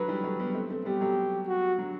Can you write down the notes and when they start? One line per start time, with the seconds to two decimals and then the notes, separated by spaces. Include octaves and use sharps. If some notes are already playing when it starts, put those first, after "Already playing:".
Already playing: D3 F#3 B4
0.08 E3 G3
0.24 F#3 A3
0.40 G3 B3
0.54 A3 C4
0.70 A3 C4
0.85 G3 B3 G4
1.01 F#3 A3
1.48 F#4
1.77 D3 F#3